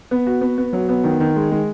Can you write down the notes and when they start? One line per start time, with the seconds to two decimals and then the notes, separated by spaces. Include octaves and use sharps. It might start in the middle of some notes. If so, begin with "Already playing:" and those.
0.11 B3
0.27 F#4
0.41 B3
0.58 B3
0.73 F#3
0.89 B3
1.04 D#3
1.20 D#3
1.36 G#3
1.51 G#3